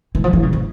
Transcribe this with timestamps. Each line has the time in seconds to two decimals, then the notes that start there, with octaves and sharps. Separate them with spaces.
0.15 E3
0.24 F3
0.33 E3
0.43 C#3
0.53 E3